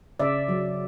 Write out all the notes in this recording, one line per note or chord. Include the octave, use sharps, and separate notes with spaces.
C#3 D5 E5
F#3